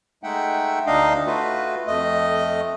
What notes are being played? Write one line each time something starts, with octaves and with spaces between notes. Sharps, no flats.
G#3 A3 D#4 E5 F#5 G5
D2 D4 D#4 D#5 F5
A3 F4 F#4 B4
F2 A3 D#5